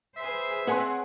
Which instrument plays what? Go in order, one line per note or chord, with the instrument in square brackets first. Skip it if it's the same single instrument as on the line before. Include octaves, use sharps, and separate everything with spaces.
[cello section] G#4 B4 C5 [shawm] E5
[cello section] C4 [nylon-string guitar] G#4 B4 C#5 [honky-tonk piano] F#5 G#5 C6